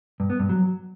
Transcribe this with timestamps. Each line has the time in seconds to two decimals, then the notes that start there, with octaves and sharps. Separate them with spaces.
0.20 G2
0.30 B3
0.40 G2
0.49 F#3